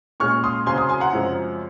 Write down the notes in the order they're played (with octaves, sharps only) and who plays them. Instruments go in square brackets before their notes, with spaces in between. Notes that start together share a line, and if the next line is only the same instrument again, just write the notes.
[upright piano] A#2 G#3 C#4 C#6 F6
C6 D#6
C#3 F#3 C4 G#5 C6
C6 D#6
G#5 C6
F#5 A#5
F#2 C#3 F3 G#3 C4